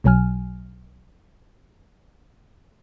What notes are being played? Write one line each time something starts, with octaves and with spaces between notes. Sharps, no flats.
B1 B2 F#3 G#5 F6